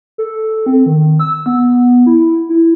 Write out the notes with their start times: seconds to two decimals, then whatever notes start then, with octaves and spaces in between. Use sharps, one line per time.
0.18 A4
0.66 C4
0.86 D#3
1.20 E6
1.46 B3
2.06 E4
2.49 E4